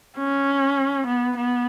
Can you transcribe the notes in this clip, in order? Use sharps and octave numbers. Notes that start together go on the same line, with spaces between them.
C#4
B3
B3